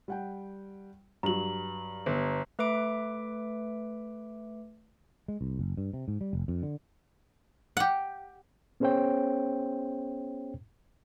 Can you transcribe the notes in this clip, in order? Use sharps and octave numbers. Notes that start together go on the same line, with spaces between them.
G3 F#5 G5
G2 F#3 A#5 F#7
G1
A3 B4 E5 D6 D7
G#3
C2
F#1
G2
C3
G#2
G3
F1
F2
D3
G4 F#5
B3 C#4 G#4 C5 C#5 G5